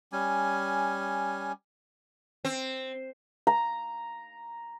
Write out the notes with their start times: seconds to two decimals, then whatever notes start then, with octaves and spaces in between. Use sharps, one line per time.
0.12 G3 C#4 G#5
2.45 C4
3.47 A#5